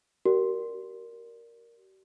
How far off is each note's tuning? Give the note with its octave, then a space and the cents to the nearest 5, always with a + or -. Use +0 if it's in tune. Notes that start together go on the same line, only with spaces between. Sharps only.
G4 -45 A#4 +0 D5 +0